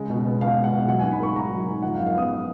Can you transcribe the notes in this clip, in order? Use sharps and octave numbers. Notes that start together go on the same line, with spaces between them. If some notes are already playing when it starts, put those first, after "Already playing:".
Already playing: C#3 G#3
B2
B3
B2 F5
G#3
F#5
B2
F#3 F#5
G#2 G#5
B5
A#3 C#6
G#2 A#5
F#3
G#2
F3 F#5
F5
F#2
F5
B3 D#6